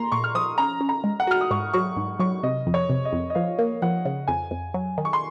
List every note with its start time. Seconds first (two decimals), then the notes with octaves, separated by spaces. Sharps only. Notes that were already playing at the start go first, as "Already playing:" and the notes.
Already playing: A#3 A#5 C6
0.12 A#2 C#6
0.24 F6
0.35 F3 D#6
0.58 C#4 A#5
0.81 C#4
0.89 A#5
1.04 G#3
1.20 F#5
1.27 F#4 F6
1.41 D#6
1.51 G#2 C#6
1.73 F#3 C#6
1.97 G#2
2.20 F#3 C#6
2.43 C3 D#5
2.67 F2
2.74 C#5
2.90 C3
3.05 D#5
3.13 F2
3.30 D#5
3.35 F3 F5
3.59 A#3
3.82 F3 F#5
4.05 C#3
4.28 F2 G#5
4.51 F2
4.74 F#3
4.98 D#3
5.05 C#6
5.13 C6